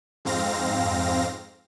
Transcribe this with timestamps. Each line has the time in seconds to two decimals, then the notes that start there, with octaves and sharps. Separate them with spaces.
0.25 F2 G#2 C4 F5 A#6